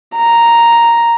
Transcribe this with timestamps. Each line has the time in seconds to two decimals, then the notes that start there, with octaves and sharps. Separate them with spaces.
0.17 A#5